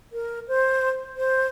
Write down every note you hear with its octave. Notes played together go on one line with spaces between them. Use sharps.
A#4
C5
C5